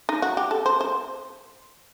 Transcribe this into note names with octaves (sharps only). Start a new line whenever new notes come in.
D#4
F#4
G4
A4
C5
C5